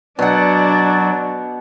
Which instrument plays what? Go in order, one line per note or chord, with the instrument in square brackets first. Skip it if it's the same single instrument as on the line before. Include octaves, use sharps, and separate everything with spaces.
[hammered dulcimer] B2 F#5 [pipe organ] F#3 [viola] D4 [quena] D5